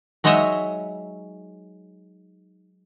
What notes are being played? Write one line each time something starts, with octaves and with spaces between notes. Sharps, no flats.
F#3 G#3 D#4 C#5 D#5 E5